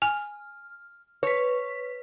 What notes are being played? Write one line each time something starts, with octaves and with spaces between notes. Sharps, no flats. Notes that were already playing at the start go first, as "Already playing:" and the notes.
G#5 F6
B4 C#5 B6